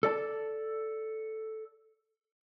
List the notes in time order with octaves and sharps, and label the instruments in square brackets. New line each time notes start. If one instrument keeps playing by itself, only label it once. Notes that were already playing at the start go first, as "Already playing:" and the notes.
[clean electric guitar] A4 D5 A5